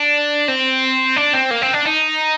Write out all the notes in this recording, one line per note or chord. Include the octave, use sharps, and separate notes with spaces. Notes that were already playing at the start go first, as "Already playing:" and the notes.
Already playing: D4
C4
D4
C4
A#3
C4
D4
D#4